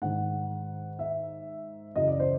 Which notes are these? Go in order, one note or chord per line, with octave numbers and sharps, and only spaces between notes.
G#2 D#3 F#5
E5
F#2 C#3 E3 D#5
D5
C5